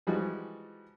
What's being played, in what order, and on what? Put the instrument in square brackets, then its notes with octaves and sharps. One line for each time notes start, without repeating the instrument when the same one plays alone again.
[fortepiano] E3 F3 G3 G#3 D#4 F#4